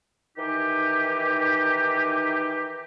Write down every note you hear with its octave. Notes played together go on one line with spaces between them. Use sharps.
D#3 E3 D#4 G4